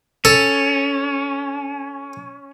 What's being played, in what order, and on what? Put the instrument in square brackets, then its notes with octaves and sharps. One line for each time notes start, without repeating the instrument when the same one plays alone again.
[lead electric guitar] C#4 [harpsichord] A4